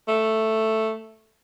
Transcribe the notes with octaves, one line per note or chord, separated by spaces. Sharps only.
A3